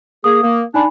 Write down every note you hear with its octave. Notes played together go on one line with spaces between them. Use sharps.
A#3 G#4 D#6
A#3
D4 D#4 G#5 B5